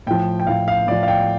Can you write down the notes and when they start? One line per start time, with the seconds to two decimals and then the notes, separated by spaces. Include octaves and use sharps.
0.07 A2 F3 G5
0.40 G5
0.47 A2 F3 F5
0.68 F5
0.87 A2 F3 D5
1.03 F5
1.08 G5